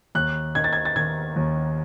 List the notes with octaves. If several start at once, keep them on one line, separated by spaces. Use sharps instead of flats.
D#2 F#6
D#3 G#6
A6
G#6
A6
D#3 G#6
D#2